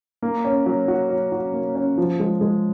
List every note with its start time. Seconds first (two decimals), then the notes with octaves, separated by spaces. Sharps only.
0.22 A#3
0.44 C#4
0.66 F#3
0.88 F#4
1.09 F#3
1.32 F#4
1.54 A#3
1.75 C#4
1.98 F3
2.20 G#3
2.41 G#3